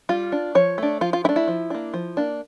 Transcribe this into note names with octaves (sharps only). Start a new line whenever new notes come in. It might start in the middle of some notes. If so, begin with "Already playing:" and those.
G3 F4
D4
F3 C#5
A3 D4
F3 F4
F4
A3 D4 E4
E4
F3
A#3 D4
F3
A#3 D4